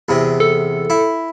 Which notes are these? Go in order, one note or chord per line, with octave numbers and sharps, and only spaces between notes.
E2 C3
A4
E4